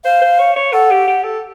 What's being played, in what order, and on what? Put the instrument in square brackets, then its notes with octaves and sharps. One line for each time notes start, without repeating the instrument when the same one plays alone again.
[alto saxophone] C5 [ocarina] F5
[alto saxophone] C5
C#5
C#5
[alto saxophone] A4 [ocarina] F#5
[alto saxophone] G4
G4
A4